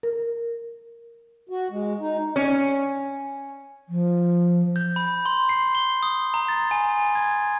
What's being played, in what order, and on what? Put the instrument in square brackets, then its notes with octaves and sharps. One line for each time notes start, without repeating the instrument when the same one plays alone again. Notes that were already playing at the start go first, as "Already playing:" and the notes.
[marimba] A#4
[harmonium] F#4
G#3
D#4
[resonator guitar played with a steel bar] C#4
[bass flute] F3
[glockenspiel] G6
B5
C6
C7
G7
D#6
A#5
A6
G#5
G#6